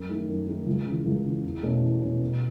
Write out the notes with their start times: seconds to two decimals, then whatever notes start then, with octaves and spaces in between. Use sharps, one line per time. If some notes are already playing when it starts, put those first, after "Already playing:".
Already playing: F#2
0.09 D#3 A3 D#4
0.28 F#2
0.47 D#3 A3 D#4
0.67 C#2
0.86 C#3 E3
1.06 C#2
1.24 C#3 E3
1.43 E2
1.63 B2 A3 C#4
1.82 E2
2.01 B2 A3 C#4
2.21 B2